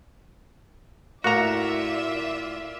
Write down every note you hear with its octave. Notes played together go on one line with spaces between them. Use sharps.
A2 A#3 F4 F#4 D5 E5 A#5